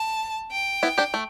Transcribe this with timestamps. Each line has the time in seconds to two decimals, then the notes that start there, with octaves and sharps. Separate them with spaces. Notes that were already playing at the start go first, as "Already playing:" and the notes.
Already playing: A5
0.51 G5
0.83 B3 E4
0.98 D4 G4
1.14 A3